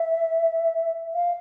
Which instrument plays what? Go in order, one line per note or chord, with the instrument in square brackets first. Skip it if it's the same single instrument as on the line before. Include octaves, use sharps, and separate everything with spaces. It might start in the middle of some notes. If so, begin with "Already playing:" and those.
Already playing: [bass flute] E5
F5